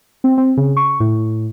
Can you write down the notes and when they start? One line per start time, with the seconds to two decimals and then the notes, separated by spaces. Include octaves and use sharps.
0.24 C4
0.38 C4
0.57 C#3
0.77 C#6
1.00 A2